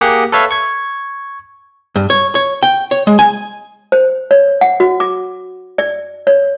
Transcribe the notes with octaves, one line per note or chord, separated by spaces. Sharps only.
A#3 G4 G#4 F#5
A4 B4 C#5 E5 F5
C#6 G#6
G2
C#5
C#5
G5
C#5
G#3
G#5
C5
C#5
F#5
F#4
D6
D5
C#5